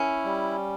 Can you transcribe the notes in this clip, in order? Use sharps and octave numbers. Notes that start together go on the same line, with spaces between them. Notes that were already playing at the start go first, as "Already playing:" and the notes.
Already playing: C#4 E4
G3